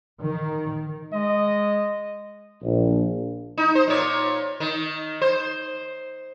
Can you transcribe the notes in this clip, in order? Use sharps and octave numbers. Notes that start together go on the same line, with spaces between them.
D#3
G#3 D#5
A#1
D#4
C5
A#2 C#5
D#3
C5